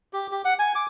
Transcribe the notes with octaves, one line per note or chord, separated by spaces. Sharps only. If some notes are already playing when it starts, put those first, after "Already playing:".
G4
G4
F#5
G#5
D6